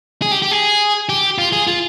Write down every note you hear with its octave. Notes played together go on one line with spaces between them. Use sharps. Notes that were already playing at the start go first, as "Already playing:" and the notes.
G#4
G4
G4
G#4
G4
F4
G#4
F4